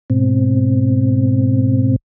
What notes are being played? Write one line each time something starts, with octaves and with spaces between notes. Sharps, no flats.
G#2 B2 C4